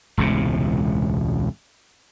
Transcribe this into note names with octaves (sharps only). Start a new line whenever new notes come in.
E1 C#2 A2 C3